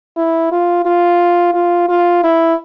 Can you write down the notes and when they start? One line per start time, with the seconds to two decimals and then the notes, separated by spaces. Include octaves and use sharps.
0.17 E4
0.51 F4
0.85 F4
1.54 F4
1.89 F4
2.24 E4